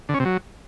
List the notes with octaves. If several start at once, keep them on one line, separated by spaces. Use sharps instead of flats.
D3
C#4
C3
F#3